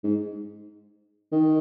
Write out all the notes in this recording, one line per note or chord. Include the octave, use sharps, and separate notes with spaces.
G#2
D#3